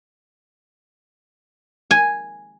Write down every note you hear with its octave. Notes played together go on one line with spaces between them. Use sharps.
G#5